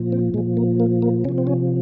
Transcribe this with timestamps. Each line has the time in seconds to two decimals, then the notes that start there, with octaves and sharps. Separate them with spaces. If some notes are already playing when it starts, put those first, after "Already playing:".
Already playing: A#2 F3
0.12 C4
0.34 A#2 F3 G#3
0.57 A#3
0.80 A#3
1.02 A#3
1.25 C3 C#4
1.29 F3
1.38 C4
1.47 C#4